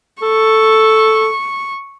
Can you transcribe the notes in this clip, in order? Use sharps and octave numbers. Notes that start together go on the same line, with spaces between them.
A4 C#6